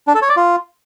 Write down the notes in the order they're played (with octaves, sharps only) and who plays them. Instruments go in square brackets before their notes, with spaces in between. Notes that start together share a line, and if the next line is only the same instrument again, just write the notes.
[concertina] D4
A4
C#5
D5
F4